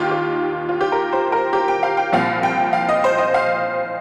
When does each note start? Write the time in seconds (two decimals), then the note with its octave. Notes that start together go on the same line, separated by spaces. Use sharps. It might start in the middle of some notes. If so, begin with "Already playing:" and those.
Already playing: D#2 D#3 F4 G4
0.11 G4
0.69 F4
0.81 G4
0.92 A#4
1.12 C5
1.32 A#4
1.53 G4
1.68 G5
1.83 F5
1.97 G5
2.12 C2 A#2 F3 F5
2.43 G5
2.73 F5
2.89 D#5
3.04 C5
3.18 D#5
3.34 F5